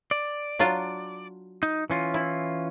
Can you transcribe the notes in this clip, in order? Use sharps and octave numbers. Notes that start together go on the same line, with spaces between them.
D5
F#3 D4 F4
D#4
E3 C#4 F4
E4